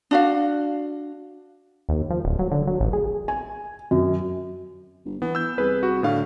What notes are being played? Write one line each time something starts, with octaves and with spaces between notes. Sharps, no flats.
D4 F#4 F5
D#2
F3
D1
F#3
D3
F#3
A1
G#4
G#5
F#2
G1
E3 B3
E6 G6
C2 G#4 B4
F#4
A2 D3 F5